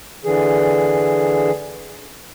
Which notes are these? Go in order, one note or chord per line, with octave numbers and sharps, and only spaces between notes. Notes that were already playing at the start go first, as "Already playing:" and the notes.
D3 E3 G#4